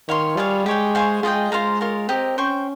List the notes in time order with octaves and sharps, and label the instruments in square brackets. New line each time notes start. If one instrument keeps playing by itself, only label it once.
[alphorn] D#3 [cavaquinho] C#5 F5 C6
[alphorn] G3 [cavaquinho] F4 G#4 C#5 F5
[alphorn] G#3 [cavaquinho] G4 C#5 G5
[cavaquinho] C5 F5 G#5 C#6
[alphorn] G#3 [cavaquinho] F4 G#4 D#5 G5
[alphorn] G#3 [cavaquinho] F4 C5 F5 A#5
[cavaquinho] F4 A#4 C#5
[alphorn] C4 [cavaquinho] G4 A#4 D#5
[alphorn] C#4 [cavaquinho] C5 G5 C#6